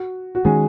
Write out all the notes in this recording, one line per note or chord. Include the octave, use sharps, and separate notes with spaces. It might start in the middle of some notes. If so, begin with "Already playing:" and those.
Already playing: F#4
F#4
D#3 G#3 C#4 G#4